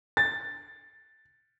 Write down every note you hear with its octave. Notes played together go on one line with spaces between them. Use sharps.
A6